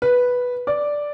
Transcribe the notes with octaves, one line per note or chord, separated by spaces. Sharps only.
B4
D5